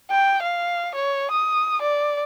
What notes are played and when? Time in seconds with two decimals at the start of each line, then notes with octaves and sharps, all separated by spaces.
0.10 G5
0.42 F5
0.95 C#5
1.31 D#6
1.82 D5